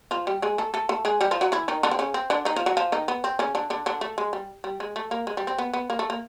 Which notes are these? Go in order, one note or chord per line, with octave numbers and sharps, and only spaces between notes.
F3 F4
G3 G4
G#3 G#4
A3 A4
A3 A4
A3 A4
G#3 G#4
G3 G4
F3 F4
F#3 F#4
E3 E4
D#3 D#4
D3 D4
C4
C#3 C#4
C4
D3 D4
D#3 D#4
F3 F4
F#3 F#4
F3 F4
D#3 D#4
B3
C4
C#3 C#4
D3 D4
D3 D4
D3 D4
A3
G#3
G3
G3
G#3
A3
A#3
G#3
G3
C4
B3
B3
A#3
A3
A#3